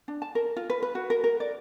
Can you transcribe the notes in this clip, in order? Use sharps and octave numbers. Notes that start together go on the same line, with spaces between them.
D4
A5
A#4
F4
B4
B4
F#4
A#4
A#4
D5